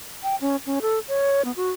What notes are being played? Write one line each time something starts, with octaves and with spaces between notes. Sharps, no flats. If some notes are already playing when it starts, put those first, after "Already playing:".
G5
C#4
C#4
A4
C#5
B3
F#4